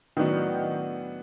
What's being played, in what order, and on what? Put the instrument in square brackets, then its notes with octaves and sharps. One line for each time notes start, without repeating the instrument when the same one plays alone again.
[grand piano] A2 F#3 B3 D4 F#4 [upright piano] D#3